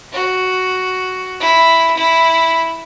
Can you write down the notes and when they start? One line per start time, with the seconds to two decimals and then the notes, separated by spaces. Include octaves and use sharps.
0.13 F#4
1.41 E4
1.97 E4